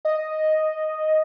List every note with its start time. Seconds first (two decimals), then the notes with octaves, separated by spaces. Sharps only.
0.05 D#5